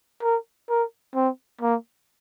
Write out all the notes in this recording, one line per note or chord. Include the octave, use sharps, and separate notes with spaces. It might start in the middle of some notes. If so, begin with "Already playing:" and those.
A#4
A#4
C4
A#3